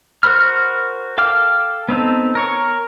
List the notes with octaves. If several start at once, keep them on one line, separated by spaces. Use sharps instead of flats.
F#4 A#4 C5 B5 F6
A4 F5 G5 D6 F6
B3 C4 D#4 A4
A#4 C#5 C#6